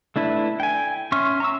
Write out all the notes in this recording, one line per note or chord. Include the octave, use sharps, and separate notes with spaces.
A3 D4 E4 B4
G5 G#5
C#4 E5 C6 C#6 F6
A#5 C#6 E6